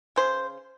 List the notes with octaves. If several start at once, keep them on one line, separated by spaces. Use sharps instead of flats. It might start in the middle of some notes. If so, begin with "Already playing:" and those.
C#3 C5